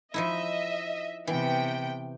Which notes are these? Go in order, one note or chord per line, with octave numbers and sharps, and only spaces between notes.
F3 D#4 E4 D#5 E5
C3 E3 B3 G5